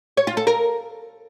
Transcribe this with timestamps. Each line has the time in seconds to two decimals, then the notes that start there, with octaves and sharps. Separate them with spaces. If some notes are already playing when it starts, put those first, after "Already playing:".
0.17 C#5
0.27 F4
0.37 A4
0.47 A#4